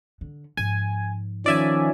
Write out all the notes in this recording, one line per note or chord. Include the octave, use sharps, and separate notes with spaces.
D3
G#2 F3 G#5
D#3 F3 C#4 D5 E5 G#5